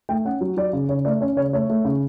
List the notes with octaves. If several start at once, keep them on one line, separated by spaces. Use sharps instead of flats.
A3 G5
C#4 F#5
F#3
F#3 D5
C#3
C#3 C#5
A3 D5
C#4 C#5
C#3 C#5
A3 C#5
A3
C#3